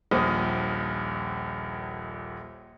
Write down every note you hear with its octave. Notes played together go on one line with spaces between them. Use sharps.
D#1 A#1 A#2 C5 D#6